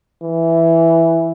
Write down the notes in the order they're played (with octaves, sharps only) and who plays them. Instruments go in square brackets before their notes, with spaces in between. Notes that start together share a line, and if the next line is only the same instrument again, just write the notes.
[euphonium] E3